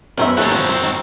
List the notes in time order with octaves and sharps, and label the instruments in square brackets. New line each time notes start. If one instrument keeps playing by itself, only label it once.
[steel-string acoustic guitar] F#2 D#3 B3 [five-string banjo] A#4 C5 E5
[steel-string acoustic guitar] D#2 A4 [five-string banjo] F#3 [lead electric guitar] C4 F#4
[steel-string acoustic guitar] F#2 [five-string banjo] F3 B3
[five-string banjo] C5
D#3